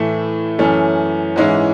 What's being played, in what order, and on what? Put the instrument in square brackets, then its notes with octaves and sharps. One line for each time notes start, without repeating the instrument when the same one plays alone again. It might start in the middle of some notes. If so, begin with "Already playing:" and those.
Already playing: [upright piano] A2 E3 A3
F#2 E3 A3 C#4
G#2 E3 G#3 C#4 E4